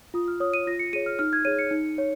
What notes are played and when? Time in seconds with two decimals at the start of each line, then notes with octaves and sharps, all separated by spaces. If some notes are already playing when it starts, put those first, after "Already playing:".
0.14 F4 D#6
0.28 F6
0.40 C#5 D#6
0.54 D#7
0.67 F4 A#6
0.79 C#7
0.93 G#4 C#5 D#7
1.06 F6
1.19 D#4 F6
1.33 G#6
1.45 G#4 C#5 D#7
1.59 C#7
1.71 D#4
1.98 C#5